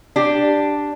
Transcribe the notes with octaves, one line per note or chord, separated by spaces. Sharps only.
D4 G4